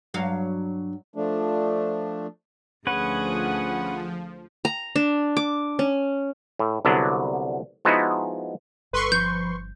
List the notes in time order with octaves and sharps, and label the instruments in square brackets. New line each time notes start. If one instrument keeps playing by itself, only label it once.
[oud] G2 F#3 F5
[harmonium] F3 A3 D4
[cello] D2 G#4 [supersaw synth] F3 [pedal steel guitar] C#4 B4 [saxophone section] F#5
[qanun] A#5
D4
D6
C#4
[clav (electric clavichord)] A2
C2 D3 F#3 B3 D4
F3 G#3 B3 D#4 E4 F#4
[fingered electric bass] G1 G2 [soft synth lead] A4 [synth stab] B4 C6 C#6
[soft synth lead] F3 [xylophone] G6